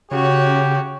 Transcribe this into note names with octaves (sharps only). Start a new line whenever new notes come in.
C#3 F#4 G4 C#5